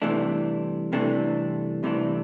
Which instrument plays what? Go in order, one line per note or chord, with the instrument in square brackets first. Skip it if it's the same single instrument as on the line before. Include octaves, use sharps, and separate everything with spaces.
[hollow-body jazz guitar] C2 C3 E3 A3 D4
C2 C3 E3 A3 D4
C2 C3 E3 A3 D4